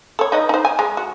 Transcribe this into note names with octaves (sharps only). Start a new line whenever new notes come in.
A4 C#5
D#4 B4 D#5
D#4 C5
G#5
G#3
F#4